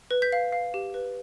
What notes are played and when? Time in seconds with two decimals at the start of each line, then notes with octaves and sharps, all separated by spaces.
0.11 B4
0.22 G6 B6
0.32 F5
0.52 F5
0.74 G4
0.94 B4